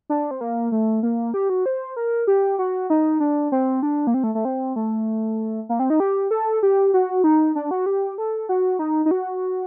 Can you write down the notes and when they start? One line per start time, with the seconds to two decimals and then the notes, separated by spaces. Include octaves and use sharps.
0.10 D4
0.31 C4
0.41 A#3
0.72 A3
1.03 A#3
1.34 G4
1.50 F#4
1.66 C5
1.97 A#4
2.27 G4
2.59 F#4
2.90 D#4
3.20 D4
3.52 C4
3.83 D4
4.07 A#3
4.14 C4
4.24 A3
4.35 A3
4.45 C4
4.76 A3
5.69 A#3
5.79 C4
5.90 D#4
6.00 G4
6.31 A4
6.63 G4
6.94 F#4
7.24 D#4
7.55 D4
7.71 F#4
7.86 G4
8.18 A4
8.49 F#4
8.79 D#4
9.06 D#4
9.11 F#4